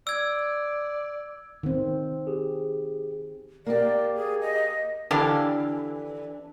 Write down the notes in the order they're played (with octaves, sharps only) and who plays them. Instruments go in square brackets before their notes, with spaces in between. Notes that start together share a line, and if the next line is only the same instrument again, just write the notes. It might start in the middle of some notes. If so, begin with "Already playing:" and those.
[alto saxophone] D5 [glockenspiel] E6 G#6
[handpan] D#3 C4
[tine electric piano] G4 G#4
[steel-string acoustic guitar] A#3 G4 [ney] D5
[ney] G#4
D#5
[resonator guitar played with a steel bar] D3 E3 [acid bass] D4 [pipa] G4 A4 F5